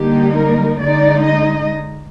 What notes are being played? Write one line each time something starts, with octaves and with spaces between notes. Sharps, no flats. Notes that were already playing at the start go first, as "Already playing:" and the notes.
Already playing: D3 G3 A#3 D#4 G4
A#4
D3 G#3 D#4 D5
D#5